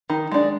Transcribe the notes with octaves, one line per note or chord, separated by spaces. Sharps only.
D#3
G#3 D4